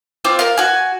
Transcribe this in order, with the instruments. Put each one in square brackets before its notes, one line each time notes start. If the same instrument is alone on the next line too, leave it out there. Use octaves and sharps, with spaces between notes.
[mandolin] C4 F4 D6
A#4 F5
F#4 G#5